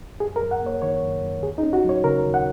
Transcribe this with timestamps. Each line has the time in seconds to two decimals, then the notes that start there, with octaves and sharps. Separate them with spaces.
0.20 F#2 G#4
0.36 A#4
0.41 F#2
0.51 F#5
0.61 A#3
0.66 C#5
0.82 D#3 C#5
1.02 F#2
1.22 F#2
1.42 D#2 G#4
1.58 D#4
1.63 C#4
1.73 F#4
1.84 F#3
1.89 C#5
2.04 C#3 A#4
2.25 D#2
2.34 F#5